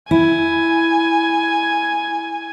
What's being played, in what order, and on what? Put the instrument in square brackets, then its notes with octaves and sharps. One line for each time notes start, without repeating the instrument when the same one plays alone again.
[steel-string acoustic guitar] E4 [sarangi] G#5